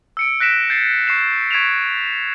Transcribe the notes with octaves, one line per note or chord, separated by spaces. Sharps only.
E6 C#7 D7
F#6 A#6 B6 D7 E7
G6 A6 C7
C#6 C7 E7
C#6 G#6 B6 D7 E7 F7